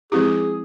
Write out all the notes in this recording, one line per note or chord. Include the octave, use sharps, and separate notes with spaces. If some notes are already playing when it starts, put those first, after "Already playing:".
F3 G#3 C4 E4 G4 G#4